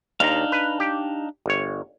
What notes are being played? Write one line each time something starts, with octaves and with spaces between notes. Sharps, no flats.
D#2 D4 D#4 F5 A#5
B4
G4
G1 C#5